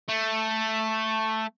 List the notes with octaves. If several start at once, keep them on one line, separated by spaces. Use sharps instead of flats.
A3